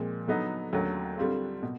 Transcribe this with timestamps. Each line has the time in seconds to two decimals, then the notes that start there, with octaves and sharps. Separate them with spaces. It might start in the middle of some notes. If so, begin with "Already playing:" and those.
Already playing: A#2 F3 G#3 C4
0.27 D3 F#3 B3 D#4
0.73 D#2 D3 F#3 A3 C#4
1.18 D3 G3 C4 F4
1.63 B2